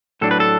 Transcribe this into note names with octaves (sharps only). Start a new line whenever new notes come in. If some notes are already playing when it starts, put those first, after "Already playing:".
A2 F#3 D4 A4
B4
A4